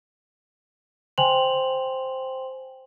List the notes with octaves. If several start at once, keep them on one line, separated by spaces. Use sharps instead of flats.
C5 G5 G#5 C6 F7 F#7